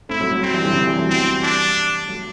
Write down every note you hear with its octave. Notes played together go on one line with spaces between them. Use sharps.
A3 C4 E4
F#3 A3
F#3 A3
C4
E3 G3
D3 F#3
C3 E3
E3 G3
F#3 A3
G3 B3 C4
D4
F#3 A3